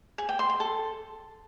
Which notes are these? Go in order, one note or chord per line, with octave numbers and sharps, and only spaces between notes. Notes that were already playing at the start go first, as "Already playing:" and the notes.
G#4
G5
C6
C6
A4